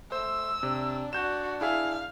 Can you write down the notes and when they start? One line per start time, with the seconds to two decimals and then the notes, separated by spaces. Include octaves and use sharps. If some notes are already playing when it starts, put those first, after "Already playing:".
0.12 A3 C5 E6
0.63 C3 D4
1.13 D4 F#4 G6 E7
1.61 E4 G#4 E5 F5